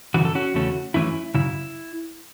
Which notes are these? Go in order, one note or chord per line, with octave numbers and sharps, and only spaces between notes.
F#2 C#3 E3 F#4
A4
C#4 F#4
E2 C#3 A3 C#4
F#2 E3 A3 C#4 E4
F#2 C#3 E4